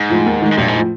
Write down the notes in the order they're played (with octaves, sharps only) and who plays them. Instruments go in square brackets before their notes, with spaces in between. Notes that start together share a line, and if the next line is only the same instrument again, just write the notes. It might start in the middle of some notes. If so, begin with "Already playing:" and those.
Already playing: [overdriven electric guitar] G#2
[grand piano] A2 F3
D#2
D#3 G#3
[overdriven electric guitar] G#2
[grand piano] A#1 [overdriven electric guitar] G2
[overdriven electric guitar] G#2
[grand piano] A2 F3